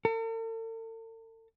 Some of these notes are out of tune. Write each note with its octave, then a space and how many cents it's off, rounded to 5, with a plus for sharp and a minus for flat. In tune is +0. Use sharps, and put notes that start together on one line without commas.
A4 +45